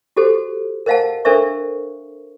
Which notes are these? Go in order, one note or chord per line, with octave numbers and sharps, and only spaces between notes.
F#4 G4 A4 C5
A#4 C5 D#5 F5 F#5 A5
D4 A4 A#4 C5 E5 C#6